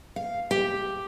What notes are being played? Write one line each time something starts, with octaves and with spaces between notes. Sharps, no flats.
F5
G4